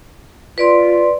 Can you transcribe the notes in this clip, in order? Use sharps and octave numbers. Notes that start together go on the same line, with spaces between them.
F4 B4 D5 C6